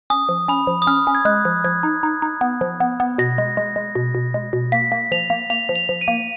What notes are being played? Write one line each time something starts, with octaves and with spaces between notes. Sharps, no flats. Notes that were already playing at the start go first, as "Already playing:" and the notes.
C#4 D#6
F3
C#4 B5
F3
D#6
C#4 F6
C#4
G#6
G#3 F#6
F3
F3 G#6
D#4
D#4
D#4
B3
F3
B3
B3
B2 A#6
G#3
G#3
G#3
B2
B2
G#3
B2
A#3 B6
A#3
F3 F7
A#3
A#3 F7
F3
F7
F3
D#7
A#3